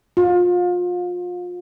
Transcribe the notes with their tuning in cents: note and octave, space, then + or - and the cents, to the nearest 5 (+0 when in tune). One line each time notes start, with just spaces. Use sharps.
F4 +30